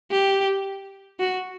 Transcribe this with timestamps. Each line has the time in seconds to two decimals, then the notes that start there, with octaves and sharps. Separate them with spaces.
0.11 G4
1.19 F#4